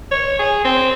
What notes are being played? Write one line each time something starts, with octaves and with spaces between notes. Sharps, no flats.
C#5
G#4
C4